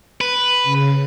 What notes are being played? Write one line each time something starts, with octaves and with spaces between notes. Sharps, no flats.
B4
C#3